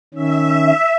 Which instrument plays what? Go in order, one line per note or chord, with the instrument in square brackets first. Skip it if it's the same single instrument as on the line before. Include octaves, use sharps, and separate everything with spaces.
[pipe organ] D#3 C#4 [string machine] E5